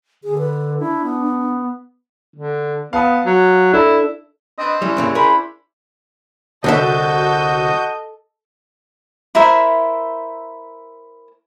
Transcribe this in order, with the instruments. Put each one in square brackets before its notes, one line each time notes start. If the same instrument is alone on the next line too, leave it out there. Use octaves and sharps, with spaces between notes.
[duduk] D3 [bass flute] G#4
[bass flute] B4
[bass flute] D4 [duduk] E4
[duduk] B3
[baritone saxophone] D3
[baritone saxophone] B3 [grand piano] F5 A5 D#6
[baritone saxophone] F#3
[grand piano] D4 A4 [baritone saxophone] E4
[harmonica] C4 [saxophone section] D4 B4 D#5
[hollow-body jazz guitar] G3 [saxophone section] C#4 D4 E4
[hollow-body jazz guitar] G2 C#3 A#3
[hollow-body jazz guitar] G#4 A#4 [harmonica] C5 B5
[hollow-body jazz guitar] C2 D3 E5 [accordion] F#4 G6 [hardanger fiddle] A4 [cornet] D#5
[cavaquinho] E4 A#4 C5 E5